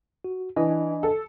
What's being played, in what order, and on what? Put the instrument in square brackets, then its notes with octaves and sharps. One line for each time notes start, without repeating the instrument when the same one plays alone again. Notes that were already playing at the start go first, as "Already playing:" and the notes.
[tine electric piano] F#4
[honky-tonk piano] E3 [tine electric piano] D4 D#5 G#5
[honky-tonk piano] A4